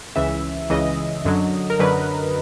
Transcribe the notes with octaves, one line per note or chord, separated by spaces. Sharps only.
C#2 C#3 E3 E5
C#2 C#3 E3 D#5
F#2 D3 F#3
A#4
F#2 D3 F#3 B4